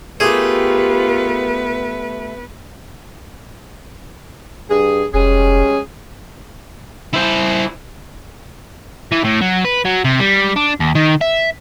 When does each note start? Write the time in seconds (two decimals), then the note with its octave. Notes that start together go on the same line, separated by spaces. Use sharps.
0.20 A3 B3 F4 G4 G#4 A#4 B4
4.70 G2 G#4
5.14 F1 G3 G#3 C#4 G#4
7.13 E4 C5
9.12 E3
9.24 A2
9.41 F#3
9.65 B4
9.85 F#3
10.04 C3
10.19 G3
10.56 D4
10.80 D#2
10.95 D#3
11.21 E5